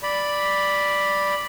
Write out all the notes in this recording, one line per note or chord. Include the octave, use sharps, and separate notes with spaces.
D5 B5